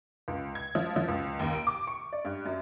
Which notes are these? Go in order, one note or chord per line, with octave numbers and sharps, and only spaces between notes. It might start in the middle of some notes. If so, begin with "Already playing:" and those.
C#2
G#6
F3
F3
C#2
D#2
D7
D6
C#6
D5
G2
F#2